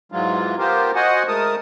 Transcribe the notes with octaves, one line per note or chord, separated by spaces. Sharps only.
G#2 E3 F#3 G#3 F4
B3 F4 G4 A#4 C5
F#4 C5 D#5 F#5 G#5
G#3 A3 A#4 A5 D#6